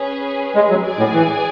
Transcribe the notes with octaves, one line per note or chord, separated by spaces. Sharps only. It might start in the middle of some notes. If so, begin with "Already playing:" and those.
Already playing: C#4 G#4 B4
G#3
F#3
G#4 D5 G#5
A2
E3